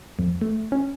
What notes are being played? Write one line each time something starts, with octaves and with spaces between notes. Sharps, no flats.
F2
A3
C#4